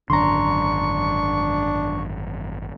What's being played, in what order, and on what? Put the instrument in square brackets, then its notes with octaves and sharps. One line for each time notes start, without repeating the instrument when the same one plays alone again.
[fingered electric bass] G#1 F#2 D3 [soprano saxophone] D4 [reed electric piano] A#5 C6 [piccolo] C#6